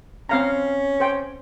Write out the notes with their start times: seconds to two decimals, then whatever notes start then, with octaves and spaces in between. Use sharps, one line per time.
0.29 C4 C#4 F5 A#5
1.00 C5 G5